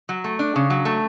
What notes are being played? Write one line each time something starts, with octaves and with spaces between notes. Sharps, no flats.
F#3
A3
D4
C#3
F#3
A3